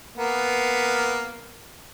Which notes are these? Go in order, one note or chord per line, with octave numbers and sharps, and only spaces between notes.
A#3 B3